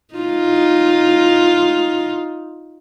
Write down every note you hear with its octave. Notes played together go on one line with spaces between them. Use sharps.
D#4 F4